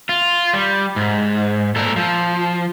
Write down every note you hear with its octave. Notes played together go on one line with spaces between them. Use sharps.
F4
G3
G#2
A#2 A4 A#4
F3